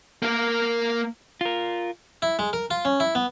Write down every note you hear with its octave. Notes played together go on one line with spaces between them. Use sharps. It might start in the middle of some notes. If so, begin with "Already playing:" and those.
A#3 A#4
F4 A#4
E4
G#3
A#4
F4
C#4
E4
B3